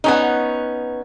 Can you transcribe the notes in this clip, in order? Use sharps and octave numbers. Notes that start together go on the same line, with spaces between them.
B3 C#4 D#4